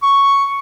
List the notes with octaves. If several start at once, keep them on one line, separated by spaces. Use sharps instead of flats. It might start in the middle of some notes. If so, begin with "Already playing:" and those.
C#6